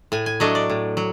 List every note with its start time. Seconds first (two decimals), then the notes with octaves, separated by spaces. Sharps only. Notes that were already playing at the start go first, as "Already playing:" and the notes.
0.12 A2 G#5
0.26 G#5
0.40 F#3 A3 D4 D#5
0.55 D5
0.70 A2
0.97 F#3